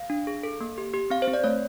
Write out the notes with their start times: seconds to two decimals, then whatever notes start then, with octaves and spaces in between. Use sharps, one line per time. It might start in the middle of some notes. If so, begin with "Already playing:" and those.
Already playing: F5
0.10 D4
0.27 G#4
0.43 A4
0.61 A#3
0.78 G4
0.94 G4
1.10 C4 F5
1.22 C5
1.28 C4
1.33 D5
1.44 A3 C#5